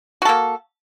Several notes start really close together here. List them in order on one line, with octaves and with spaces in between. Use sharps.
F#4 A4 A#3